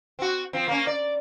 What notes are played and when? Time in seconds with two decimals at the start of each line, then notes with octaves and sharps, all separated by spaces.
0.19 C4 F#4
0.53 F3 C4
0.68 A#3 C#4
0.87 D5